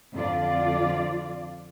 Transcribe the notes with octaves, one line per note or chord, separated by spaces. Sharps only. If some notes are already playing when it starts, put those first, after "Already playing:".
F2 D3 F4 D5